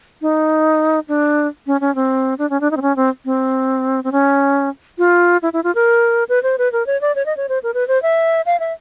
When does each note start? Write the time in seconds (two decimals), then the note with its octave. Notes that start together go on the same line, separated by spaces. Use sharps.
0.22 D#4
1.08 D4
1.67 C#4
1.81 C#4
1.95 C4
2.38 D4
2.50 C#4
2.61 D4
2.71 D#4
2.77 C4
2.82 C#4
2.96 C4
3.25 C4
4.04 C4
4.12 C#4
4.98 F4
5.43 E4
5.53 E4
5.64 F4
5.75 A#4
6.29 B4
6.43 C5
6.58 B4
6.72 A#4
6.87 C#5
7.01 D5
7.15 C#5
7.26 D#5
7.37 C#5
7.49 C5
7.63 A#4
7.74 B4
7.88 C5
8.02 E5
8.46 F5
8.60 E5